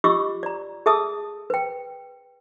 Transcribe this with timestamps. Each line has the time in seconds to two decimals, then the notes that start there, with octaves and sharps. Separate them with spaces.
0.04 F4 G4 D#5 C#6 D6 E6
0.43 D5 A#5
0.86 G#4 A4 E5 A5 D#6 E6
1.50 B4 G5